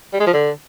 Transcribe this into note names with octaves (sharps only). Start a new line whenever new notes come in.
G3
G#3
F3
D3